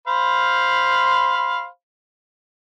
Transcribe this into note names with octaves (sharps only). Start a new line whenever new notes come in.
C5 F5 B5